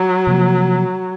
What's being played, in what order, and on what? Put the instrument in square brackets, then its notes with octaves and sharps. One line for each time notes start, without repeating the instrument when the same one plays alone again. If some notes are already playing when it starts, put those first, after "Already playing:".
Already playing: [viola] F#3
[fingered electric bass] C3 F3 A#3